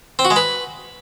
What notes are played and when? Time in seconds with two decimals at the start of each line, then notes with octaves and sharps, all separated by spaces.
0.19 C4
0.25 F#4
0.30 G#3
0.36 B4